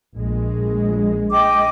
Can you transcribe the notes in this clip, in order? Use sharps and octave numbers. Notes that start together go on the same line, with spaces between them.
A#1 G#3
D#5 G5 D6